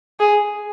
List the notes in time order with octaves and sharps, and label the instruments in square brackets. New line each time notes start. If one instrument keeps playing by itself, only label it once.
[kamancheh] G#4